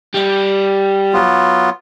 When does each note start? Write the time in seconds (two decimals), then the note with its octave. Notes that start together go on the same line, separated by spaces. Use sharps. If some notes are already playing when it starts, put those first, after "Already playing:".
0.14 G3
1.13 F#3 B3 F4